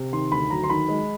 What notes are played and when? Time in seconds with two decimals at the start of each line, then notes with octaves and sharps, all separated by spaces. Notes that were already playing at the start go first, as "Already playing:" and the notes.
Already playing: C3
0.13 D#3 C6
0.32 D2 B5
0.50 F#3 A#5
0.64 C6
0.70 D#3 B5
0.89 G#3